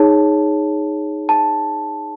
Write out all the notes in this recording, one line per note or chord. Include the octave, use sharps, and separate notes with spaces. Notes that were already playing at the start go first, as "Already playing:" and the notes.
Already playing: D#4 G#4 C#5 A5
A5